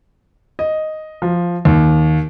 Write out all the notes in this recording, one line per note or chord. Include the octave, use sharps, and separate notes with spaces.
D#5
F3
D#2